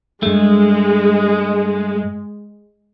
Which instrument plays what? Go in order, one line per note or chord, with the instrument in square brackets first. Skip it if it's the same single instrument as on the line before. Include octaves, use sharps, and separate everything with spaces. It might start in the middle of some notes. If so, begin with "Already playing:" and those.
[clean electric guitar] G2 A3 [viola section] G#3